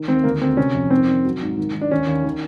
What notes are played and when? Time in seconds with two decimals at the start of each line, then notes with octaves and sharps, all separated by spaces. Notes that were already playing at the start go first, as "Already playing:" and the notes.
Already playing: D#3
0.08 D#2 C4
0.24 D2 A#3
0.41 D2 C4
0.57 C3 C#4
0.74 F2
0.90 D#3 C4
1.08 D#3
1.25 F#3
1.41 G#2
1.58 D#3
1.75 D#3
1.81 D4
1.91 D#2 C#4
2.07 D#2
2.24 D#3